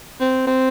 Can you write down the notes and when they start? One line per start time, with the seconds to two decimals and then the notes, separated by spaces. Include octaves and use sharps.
0.20 C4
0.47 C4